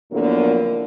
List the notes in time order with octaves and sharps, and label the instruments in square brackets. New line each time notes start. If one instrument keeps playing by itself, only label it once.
[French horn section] F2 A2 D3 F#3 A#3 B3